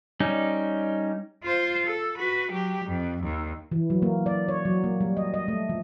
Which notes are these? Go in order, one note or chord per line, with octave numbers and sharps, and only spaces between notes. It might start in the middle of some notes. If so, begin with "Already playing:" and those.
G3 C#4 D#4
F4 C5
A4
F#4 B4
F#3 G4
F2
D#2
E3
F#3
A#3
D5
C#5
F#3
A#3
G3
D#5
D#5
A3
F3